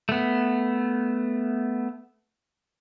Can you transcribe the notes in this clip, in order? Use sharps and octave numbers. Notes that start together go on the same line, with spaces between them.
A3 B3